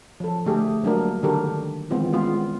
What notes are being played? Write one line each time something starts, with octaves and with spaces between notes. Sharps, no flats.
F3 A4
D3 A3 G4 G#4
F#3 G3 A#3 D4 F#4 A#4
D3 D#3 G4 A4 A#4
D#3 E3 G#3 B3 C4 F4
G3 G#3 B3 C#4 F4